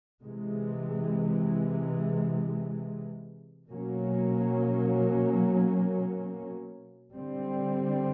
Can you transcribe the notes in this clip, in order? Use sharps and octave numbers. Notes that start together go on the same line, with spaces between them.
C3 E3 G#3
B2 F#3 A#3 C#4
D3 G3 C4